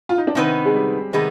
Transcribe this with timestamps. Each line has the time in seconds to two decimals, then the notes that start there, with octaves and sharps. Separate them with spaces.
0.09 F4
0.18 D#4
0.27 D4
0.35 C3 D#3 B3 C4 D#4 B4
0.65 G#3
0.75 G3
1.13 C3 D#3 G#3 B3 D#4 B4